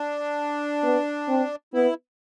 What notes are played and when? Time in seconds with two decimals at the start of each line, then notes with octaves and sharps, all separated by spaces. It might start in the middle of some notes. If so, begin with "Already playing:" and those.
Already playing: D4
0.83 B3
1.28 C4
1.74 B3 E4